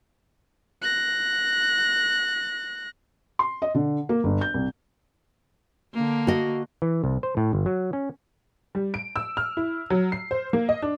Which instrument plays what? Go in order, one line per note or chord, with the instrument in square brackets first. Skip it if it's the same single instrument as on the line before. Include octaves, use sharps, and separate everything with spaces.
[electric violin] F#6 A#6
[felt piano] C6
D#5
D3
A#3
G1
G6
C2
[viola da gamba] D3 A#3
[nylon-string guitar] F#4 D#5
[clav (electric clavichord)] E3
C2
C5
A2
G1
F#3
C#4
[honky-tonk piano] G3
D7
E6
F6
E4
F#3
C7
C5
A#3
D#5
D4